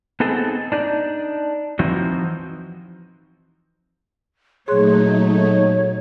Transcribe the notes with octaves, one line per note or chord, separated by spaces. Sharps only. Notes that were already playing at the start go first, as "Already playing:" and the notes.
B3 C4 D#4 G#4 A4
D4 D#4 D5
E3 F3 C4 D#4 F#4
A#2 F#3 A3 D#4 G#4 C#5 C6 F#6